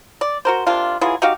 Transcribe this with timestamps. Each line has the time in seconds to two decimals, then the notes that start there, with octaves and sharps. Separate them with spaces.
0.21 D5
0.45 F#4 A#4 C5
0.67 C3 A#3 D4 F4
1.01 E3 F#3 F4 G#4
1.22 D#4 F#4 G4 F5